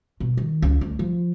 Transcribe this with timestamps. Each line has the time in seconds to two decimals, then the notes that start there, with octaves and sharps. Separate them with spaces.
0.20 B2
0.37 D#3
0.62 C#2
0.81 D2
0.99 F3